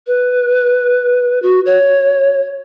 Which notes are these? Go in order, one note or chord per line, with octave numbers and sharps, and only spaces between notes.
B4
F#4
C#5